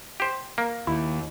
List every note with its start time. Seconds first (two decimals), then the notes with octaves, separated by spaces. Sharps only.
0.20 G4 C5
0.58 A#3
0.87 D#2 E4